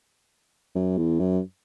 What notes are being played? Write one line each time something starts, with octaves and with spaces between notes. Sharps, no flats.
F#2
E2
F#2